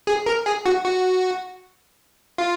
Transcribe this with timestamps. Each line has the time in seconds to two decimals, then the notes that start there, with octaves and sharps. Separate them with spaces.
0.07 G#4
0.26 A#4
0.46 G#4
0.66 F#4
0.84 F#4
2.38 F4